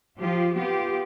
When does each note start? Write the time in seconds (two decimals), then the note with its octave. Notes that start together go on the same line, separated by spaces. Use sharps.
0.19 F3 F4 G4
0.53 B3 F4 G4